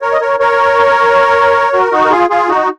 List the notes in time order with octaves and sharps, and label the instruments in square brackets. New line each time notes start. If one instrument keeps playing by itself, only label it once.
[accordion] A#4 C#5
D#5
A#4 C#5
A#4 C#5
F#4 A#4
D#4 F#4
A#4
F4 G#4
F4 G#4
D#4 F#4